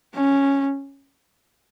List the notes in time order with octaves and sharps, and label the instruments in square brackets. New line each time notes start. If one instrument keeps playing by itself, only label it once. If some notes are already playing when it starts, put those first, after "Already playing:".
[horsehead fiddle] C#4